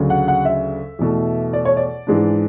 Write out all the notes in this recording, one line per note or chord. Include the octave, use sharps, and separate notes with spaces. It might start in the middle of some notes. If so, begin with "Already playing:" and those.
Already playing: D2 C#3 F#3
F#5
F#5
E5
E2 B2 A3
D5
C#5
D5
G#2 E3 G#3 D4